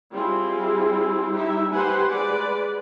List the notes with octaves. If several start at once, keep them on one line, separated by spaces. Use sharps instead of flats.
G3 C4 E4 F4 G#4
G3 D#4 E4 G4 E5
G4 B4 C5 F#5 G#5
G#3 B4 D5